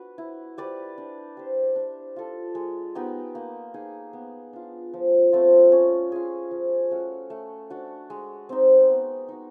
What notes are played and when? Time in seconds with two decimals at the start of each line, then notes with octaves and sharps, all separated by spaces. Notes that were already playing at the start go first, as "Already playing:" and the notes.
Already playing: D4 F#4 B4
0.18 E4
0.58 G4 B4 D5
0.98 D4
1.37 G4 C5
1.76 D4
2.16 F4 A4
2.55 G#3
2.95 B3 D#4 G4
3.35 A#3
3.74 D#4 G#4
4.13 B3
4.53 D4 F4
4.94 F3
5.32 A3 C4 F4
5.72 C#4
6.12 F4 G#4
6.51 F3
6.91 A3 C#4 F#4
7.30 A3
7.70 D4 F#4
8.10 G#3
8.49 C4 D#4
8.89 B3
9.29 D#4 F#4